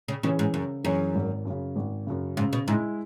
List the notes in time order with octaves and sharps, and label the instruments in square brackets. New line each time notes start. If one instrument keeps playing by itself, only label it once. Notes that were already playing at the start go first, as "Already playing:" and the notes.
[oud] C#3
[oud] C#3 [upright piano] E3 C#4 G#4 C#5
[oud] G#2
[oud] F#2 [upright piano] C#3
[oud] F#2 [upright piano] E3 C#4 G#4 C#5
[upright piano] G#1
F#2
C#3
G#1
F#2 C#3
[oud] G#2 [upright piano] C#3
[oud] B2
[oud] G#2 [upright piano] G#3 E4